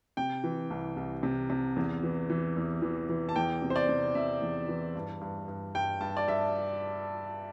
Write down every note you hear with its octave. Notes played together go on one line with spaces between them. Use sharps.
C3 G5
E3
C2
C2
C3
C3
E2
E3
E3
E2
E3
E3
A5
E2 G5
C3
C5
D5
C3
C3 E5
E2
E3
G2
G2
G2
G2 G5
G2 A5
D5
G2 E5